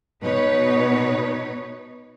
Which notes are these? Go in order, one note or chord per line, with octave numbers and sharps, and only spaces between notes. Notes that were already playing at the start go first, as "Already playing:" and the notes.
B2 D#4 B4 C#5